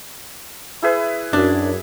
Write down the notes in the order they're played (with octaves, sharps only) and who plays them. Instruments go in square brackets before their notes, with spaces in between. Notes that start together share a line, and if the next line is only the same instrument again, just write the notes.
[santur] E4 G#4 B4
[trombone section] F#2 [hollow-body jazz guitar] D4